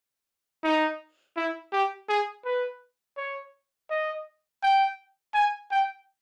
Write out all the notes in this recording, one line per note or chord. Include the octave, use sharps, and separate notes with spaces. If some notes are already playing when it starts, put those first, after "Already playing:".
D#4
E4
G4
G#4
B4
C#5
D#5
G5
G#5
G5